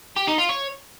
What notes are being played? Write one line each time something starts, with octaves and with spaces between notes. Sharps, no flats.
G4
D#4
F4
C#5